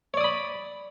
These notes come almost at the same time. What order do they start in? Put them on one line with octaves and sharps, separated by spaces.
C#5 D5 D#6 B5